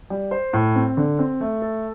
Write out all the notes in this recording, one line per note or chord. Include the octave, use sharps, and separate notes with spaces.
G3
C5
A2
C4
D3
C4
A3
A4